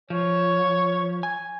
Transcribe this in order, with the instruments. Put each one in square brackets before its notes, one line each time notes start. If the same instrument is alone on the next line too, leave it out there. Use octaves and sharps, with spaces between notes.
[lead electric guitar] F3 [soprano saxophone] C#5
[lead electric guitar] G#5